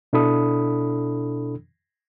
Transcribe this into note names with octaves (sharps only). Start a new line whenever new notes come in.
B2 D4 E4 A4 B5 D#6